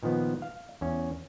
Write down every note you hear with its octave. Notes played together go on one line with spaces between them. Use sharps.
A#2 D#3 F3 B3
F5
E2 C#4